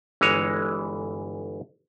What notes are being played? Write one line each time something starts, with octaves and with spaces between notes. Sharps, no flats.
G1 E3 G#3 C#5